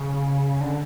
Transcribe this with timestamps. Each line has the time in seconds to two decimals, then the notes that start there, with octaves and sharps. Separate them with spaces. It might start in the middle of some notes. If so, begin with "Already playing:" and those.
Already playing: C#3
0.61 D3